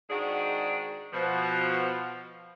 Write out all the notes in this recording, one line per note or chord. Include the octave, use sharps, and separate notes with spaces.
G#2 D#3 G#3 D4 F#4 G#4
B2 F3